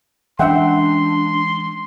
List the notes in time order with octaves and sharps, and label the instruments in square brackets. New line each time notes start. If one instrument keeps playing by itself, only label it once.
[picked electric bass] E3 G#3 C#4 [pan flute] D4 [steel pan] E5 F#5 G5 [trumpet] C6